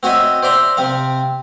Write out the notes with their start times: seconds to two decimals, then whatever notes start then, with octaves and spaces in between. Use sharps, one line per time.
0.03 C4 F#4 C#5 D#5 E5
0.43 C5 D5 E5 A#5 C6
0.77 C3 C4 F5